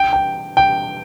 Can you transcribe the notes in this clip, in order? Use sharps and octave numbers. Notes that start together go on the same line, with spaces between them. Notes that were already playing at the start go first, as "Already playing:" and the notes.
Already playing: G5
G5
G5